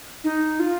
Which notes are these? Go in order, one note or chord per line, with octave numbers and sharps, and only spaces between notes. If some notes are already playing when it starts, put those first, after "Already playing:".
D#4
F4